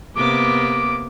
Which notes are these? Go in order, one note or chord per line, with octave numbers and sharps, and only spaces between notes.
C3 A#3 B3 D6